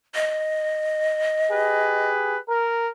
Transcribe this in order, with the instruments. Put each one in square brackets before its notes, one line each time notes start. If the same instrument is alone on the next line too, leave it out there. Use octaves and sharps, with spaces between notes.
[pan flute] D#5
[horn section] G4 G#4 B4
A#4